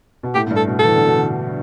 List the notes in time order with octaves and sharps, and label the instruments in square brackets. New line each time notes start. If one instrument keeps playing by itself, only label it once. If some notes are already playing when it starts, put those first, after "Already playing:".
[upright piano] B2
[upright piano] A2 [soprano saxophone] G4
[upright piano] A2
G2
[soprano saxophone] A4
[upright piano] B2
[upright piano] E3 [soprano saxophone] A4
[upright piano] D3
B2
D3